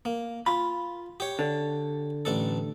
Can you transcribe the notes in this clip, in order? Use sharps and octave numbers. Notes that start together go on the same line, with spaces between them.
A#3
F4 B5
G4 C#5
D3
A1 D4 A4